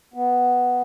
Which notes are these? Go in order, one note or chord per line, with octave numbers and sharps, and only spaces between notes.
B3